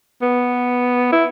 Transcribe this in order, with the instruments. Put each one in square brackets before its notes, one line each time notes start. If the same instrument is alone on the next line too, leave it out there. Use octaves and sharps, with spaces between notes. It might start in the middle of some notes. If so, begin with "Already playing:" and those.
[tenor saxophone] B3
E4